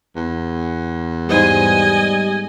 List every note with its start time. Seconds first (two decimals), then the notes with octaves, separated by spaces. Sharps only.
0.16 E2
1.29 G#2 G3 G#3 B3 D#5 G#5